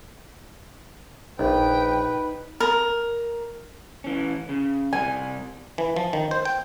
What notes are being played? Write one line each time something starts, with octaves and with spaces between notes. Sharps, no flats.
A#1 D#4 B4 G5
A#4
E3 C#4
C#3
C3 G3 G#5
E3
F3
D#3
C5
G5